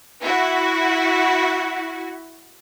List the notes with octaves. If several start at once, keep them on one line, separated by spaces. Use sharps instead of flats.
E4 F#4